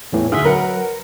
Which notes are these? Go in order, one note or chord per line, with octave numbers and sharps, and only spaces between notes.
E2 A2 E3
D2 G#4 E5
F#3 A#4 B4 F#5